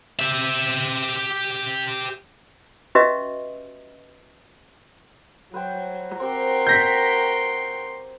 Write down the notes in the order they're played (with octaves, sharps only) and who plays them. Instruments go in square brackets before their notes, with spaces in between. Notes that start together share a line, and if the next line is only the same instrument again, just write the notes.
[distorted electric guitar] G4 E5
[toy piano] C#4 F#4 G4 B4 D#5 E5
[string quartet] F#3 [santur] B4 C5 G5
[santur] C4 G4 [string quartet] F#4 A#4 G5 [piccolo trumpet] C6
[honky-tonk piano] G6 A#6 B6